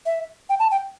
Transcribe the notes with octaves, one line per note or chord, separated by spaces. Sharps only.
E5
G5
A5
G5